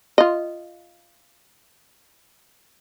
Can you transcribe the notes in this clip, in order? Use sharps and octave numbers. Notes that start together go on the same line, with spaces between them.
F4 D#5